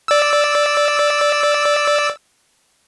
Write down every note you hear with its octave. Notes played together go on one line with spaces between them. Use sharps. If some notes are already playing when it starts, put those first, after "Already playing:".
D5 E6